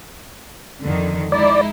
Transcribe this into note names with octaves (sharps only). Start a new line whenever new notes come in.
F2 D3 D#3
G#3 D#4 E4 D5